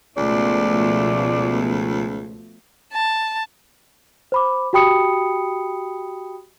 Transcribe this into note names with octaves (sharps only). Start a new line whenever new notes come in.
C#2 B2 F3 A3 D5
A5
C5 B5 D6
F#4 G4 G5 B5 D#6 C#7